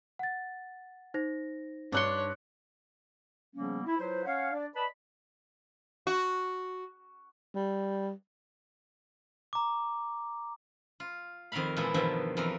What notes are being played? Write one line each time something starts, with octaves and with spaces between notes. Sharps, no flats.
F#5 A6
D#4 C5 A#6
G2 D4 C#5 C6 F#6 C#7
C#3 F3 G3 A#3 B3 C#4
E4
F#3 E4 F4 B4 C5
C#4 C#5 F5 F#5
D4 D5
B4 D5 D#5 A5 B5
F#4
G3
A#5 D6
F4
F2 D#3 F4 A#4 F5 B5
A#2 E3 G#3 B3 E4 A4
E2 G2 B2 D#3 F3 E5
F2 E3 F3 A#4